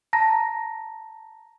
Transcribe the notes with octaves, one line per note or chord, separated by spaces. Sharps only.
A5 A#5 A#6